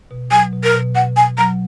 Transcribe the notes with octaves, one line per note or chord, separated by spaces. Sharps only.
B2
F#3 G#5
B2
A#4
B2
B2 F#5
B2 G#5
F#3 A#5